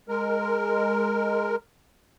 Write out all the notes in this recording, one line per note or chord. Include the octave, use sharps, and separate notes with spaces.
G#3 A#4